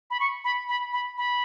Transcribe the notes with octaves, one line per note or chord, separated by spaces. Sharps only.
B5
C#6
B5
B5
B5
B5